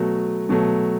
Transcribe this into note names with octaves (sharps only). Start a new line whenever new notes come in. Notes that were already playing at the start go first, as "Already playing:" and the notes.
Already playing: B2 F#3 A3
B2 F#3 A3